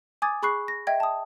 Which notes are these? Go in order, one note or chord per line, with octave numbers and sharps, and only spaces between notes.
G#5 D6 D#6 G#6 A6
G#4 B5 C#6 F#6 C7
A#6
D#5 E5 G5 G#6
A5 D#6